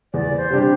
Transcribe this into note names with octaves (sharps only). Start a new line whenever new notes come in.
E2 D5
C5
C3 G3 D4 G4